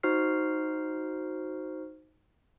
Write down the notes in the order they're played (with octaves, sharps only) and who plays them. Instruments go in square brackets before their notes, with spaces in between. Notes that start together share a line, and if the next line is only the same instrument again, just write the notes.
[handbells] D#4 F#4 C5 F6 C7